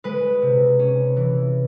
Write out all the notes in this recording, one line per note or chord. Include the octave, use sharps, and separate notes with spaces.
G#3 B4
C3
C#4
E3